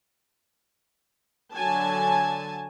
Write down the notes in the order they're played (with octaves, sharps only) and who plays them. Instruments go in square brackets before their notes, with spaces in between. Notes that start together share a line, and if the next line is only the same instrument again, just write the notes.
[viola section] D3 F#3 G#5 A5